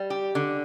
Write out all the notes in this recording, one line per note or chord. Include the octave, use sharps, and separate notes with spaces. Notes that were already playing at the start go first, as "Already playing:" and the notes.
Already playing: G3
G4
D3